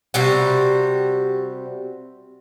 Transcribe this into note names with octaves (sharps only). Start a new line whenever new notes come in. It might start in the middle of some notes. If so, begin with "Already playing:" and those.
C3 G3 F#4